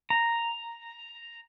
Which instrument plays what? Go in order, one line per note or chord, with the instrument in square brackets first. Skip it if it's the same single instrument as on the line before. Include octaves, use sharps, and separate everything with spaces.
[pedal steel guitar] A#5